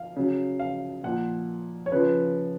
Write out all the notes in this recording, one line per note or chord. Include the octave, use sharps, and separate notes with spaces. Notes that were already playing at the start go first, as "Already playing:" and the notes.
Already playing: F5
C#3 F#3
F5
A#2 F3 F#5
C#5
C#3 F3 B4